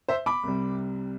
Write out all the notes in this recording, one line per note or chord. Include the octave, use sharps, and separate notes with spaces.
C5 E5
B5 D6
C2 C3 G3